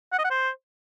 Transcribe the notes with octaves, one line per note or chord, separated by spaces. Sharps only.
F#5
D#5
F#5
C5